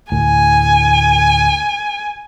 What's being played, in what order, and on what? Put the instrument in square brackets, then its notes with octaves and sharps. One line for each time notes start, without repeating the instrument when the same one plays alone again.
[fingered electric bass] D2 A2 [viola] G#5